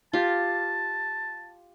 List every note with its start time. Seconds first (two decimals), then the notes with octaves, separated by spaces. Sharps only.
0.13 F4 G4 A5